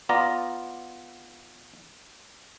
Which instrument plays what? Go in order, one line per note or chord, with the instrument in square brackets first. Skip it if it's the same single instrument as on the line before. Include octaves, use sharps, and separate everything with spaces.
[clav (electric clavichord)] B3 F4 D5 A#5